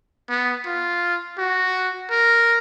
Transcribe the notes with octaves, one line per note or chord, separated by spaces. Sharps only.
B3
F4
F#4
A#4